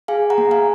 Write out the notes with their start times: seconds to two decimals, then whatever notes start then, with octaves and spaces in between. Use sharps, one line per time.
0.08 G#4 F5 G#5
0.30 F#5 A#5
0.38 A#3
0.51 F5 G#5